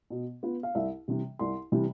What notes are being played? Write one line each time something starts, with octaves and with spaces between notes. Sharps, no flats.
B2
B3 F4
F5
C2 E5
C3 E3 G3
C2 C6
C3 E3 G3